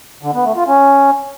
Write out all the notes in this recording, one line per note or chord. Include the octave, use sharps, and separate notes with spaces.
D3
B3
A3
F4
C#4